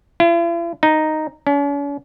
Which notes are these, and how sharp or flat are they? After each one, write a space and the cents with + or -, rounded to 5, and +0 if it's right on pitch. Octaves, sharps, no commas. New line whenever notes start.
E4 +45
D#4 -5
C#4 +45